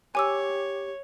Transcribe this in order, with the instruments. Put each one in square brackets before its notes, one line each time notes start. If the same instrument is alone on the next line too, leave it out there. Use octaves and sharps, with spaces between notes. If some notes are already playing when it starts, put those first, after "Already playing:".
[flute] G4 [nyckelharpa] C#5 [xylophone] G#5 D6 E6